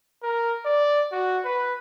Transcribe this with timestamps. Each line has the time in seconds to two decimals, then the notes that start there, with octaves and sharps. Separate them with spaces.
0.23 A#4
0.65 D5
1.12 F#4
1.45 B4